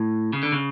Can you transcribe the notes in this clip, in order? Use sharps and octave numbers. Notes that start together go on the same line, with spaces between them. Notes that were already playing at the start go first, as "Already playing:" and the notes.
Already playing: A2
C#3
D3
C#3